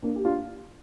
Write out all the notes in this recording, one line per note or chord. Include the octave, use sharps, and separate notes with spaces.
A#3 D4
G4
D4 F4